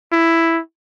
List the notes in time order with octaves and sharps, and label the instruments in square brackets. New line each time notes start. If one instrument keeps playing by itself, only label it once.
[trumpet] E4